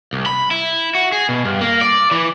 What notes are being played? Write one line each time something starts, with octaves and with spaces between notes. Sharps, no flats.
C2
B5
E4
F#4
G#4
B2
G2
A#3
D5
E3